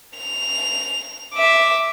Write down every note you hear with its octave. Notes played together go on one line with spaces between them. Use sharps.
F7
E5 D6